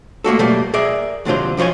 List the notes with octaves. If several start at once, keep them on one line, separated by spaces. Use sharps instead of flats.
A3 A#3 F#4 A4
B2 F#3 G3 A3 A#3
G#4 A#4 D5 E5
D#2 C3 F#3 D4 F4 C5
B1 F3 F4 C#5 G#5